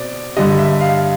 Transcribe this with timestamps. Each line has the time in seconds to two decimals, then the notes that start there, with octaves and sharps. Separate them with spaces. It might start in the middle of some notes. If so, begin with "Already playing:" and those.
Already playing: B2 C4 D5
0.37 G2 D3 G3 D#5
0.59 E5
0.81 F5